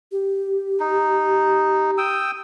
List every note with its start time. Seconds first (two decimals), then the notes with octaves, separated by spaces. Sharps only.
0.12 G4
0.80 D#4
1.98 G5 D#6 E6